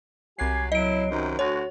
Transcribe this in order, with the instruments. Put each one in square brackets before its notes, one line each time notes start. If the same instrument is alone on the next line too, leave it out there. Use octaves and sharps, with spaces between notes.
[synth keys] C2 C7 [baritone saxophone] F#3 [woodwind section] F#4 G4 G#5
[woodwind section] F#3 [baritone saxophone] E4 [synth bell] D#5 D7
[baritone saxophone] F#2 [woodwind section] C3 D#3 D#4
[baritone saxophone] D2 [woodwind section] F#4 [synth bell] C#5